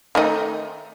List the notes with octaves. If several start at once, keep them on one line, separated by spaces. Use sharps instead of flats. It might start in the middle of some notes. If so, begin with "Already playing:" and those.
D#3 A3 D#4